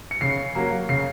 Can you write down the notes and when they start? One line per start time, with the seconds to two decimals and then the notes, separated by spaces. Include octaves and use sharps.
0.11 C#7
0.21 C#3 C7
0.55 F#3 A#3
0.89 C#3 C7